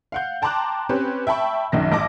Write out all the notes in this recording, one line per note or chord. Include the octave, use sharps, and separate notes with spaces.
F5 F#5 G6
G5 A5 A#5 C6 D6 F#6
C4 C#4 G4 B4
E5 G5 A5 B5 C#6
A#1 F#2 D#3 A#6
A1 D#5 A5 D6 A#6